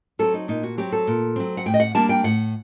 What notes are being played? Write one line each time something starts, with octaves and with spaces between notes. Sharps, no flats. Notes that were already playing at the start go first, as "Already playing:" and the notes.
F#3 C4 A4
D#4
A#2 D#4
F#4
F#3 C4 G4
A4
A#2
F#3 C4
F#5
A2 G5
D#5
F#5
G3 A#3 D4 A5
G5
A2 F#5